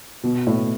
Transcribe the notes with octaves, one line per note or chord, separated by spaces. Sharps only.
B2
A2